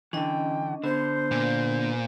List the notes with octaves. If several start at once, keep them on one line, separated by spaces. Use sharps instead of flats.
D3 E3 C#4 D4 D#5 G5
D3 B3 C5
A#2